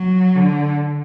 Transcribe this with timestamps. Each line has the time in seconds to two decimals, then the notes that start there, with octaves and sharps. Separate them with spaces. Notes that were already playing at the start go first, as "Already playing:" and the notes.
Already playing: F#3
0.36 D3